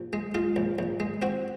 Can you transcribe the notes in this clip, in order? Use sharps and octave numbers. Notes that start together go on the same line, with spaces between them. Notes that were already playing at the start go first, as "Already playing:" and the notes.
Already playing: A#1
G#3
G#3 F4
A#1
A#1
G#3
C4 F#4